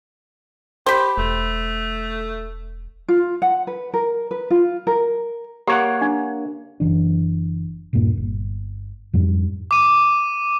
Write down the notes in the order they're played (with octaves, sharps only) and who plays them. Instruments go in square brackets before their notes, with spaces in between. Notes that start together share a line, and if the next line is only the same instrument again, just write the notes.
[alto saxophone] G4 [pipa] C5 B5
[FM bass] E1 [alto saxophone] A3
[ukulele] F4
F#5
B4
A#4
B4
F4
A#4
[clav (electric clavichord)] A#3 C#5 F#5 [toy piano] G4
[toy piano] D4
[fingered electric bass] F#1 E3 D4
D#1 G2 A#2 A#3
G1
F2 G#2 G3
[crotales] D6 D#7